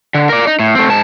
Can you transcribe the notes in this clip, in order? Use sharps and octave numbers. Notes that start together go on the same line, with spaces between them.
D3
A#4 D5
D#4
A2
A3 C4
G#2 A5